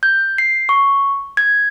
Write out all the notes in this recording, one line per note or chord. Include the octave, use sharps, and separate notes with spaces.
G6
C7
C#6
G#6